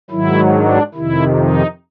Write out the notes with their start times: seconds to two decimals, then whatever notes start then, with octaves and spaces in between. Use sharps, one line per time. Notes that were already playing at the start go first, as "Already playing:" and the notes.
0.10 G#2 D#3 F#3 E4
0.53 D4
0.95 F2 C3 D#3 E4
1.37 D#4